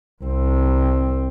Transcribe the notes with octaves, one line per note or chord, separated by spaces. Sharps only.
C2 C4